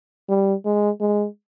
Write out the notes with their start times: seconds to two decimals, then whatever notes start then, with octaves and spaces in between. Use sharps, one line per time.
0.29 G3
0.65 G#3
1.01 G#3